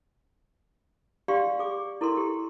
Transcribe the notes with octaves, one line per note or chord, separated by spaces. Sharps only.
G4 D5 F5 C6
G#4 D6
E4 A4 A#4 C6
G4